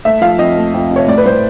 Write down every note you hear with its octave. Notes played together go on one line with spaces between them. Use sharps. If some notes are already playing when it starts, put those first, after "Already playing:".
A3 E5
F3 F5
F2 D#5
A3
F2
C3
C#5
A2 D5
B4
A2 C5